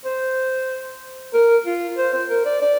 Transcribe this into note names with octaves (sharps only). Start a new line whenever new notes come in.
C5
A#4
F4
C5
C5
A#4
D5
D5